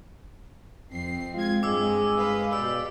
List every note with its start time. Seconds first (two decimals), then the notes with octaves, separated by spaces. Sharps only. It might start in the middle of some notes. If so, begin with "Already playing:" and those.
0.90 F2 C4 C7
1.34 G#3 F4 G#6
1.63 G2 G#3 D6 E6
2.17 B4 F5
2.53 B2 G4 D5 E6